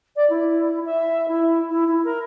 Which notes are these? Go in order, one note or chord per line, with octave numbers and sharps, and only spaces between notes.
D5
E4
E5
E4
E4
E4
A#4